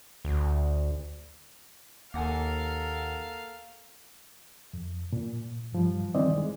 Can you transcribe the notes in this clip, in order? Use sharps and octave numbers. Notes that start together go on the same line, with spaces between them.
D2
D#2 A#3 A4 A#4 F5 F#5 G#5
F2
A#2
G2 F3 G3
D#3 E3 G3 C4 D5 D#5
G#3